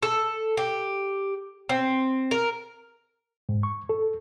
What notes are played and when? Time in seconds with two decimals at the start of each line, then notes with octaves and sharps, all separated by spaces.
0.03 A4
0.57 G4
1.69 C4
2.31 A#4
3.49 G#2
3.63 C#6
3.89 A4